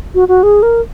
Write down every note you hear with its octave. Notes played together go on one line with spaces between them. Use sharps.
F#4
F#4
G#4
A#4